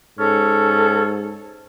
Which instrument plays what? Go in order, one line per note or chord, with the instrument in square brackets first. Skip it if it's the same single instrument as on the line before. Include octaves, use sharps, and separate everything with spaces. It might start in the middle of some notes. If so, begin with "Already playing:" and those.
[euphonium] G#2 [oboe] C#4 [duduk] A4